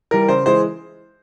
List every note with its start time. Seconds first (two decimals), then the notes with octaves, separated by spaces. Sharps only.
0.11 E3 G3 A#4
0.28 C#3 C5
0.46 E3 G#3 C5